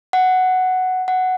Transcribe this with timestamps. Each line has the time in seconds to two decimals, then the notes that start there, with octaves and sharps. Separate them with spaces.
0.13 F#5
1.08 F#5